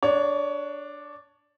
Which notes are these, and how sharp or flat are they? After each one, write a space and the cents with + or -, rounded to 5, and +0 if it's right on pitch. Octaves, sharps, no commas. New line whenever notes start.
D4 +0 C#5 +20